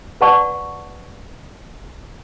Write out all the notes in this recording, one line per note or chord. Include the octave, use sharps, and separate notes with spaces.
B4 D5 F#5 A5 C#6